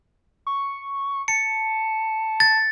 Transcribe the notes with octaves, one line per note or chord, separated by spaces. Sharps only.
C#6
A5 C#7
A6